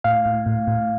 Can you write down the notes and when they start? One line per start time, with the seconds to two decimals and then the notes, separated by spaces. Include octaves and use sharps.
0.04 A2 F5
0.26 A2
0.46 A2
0.67 A2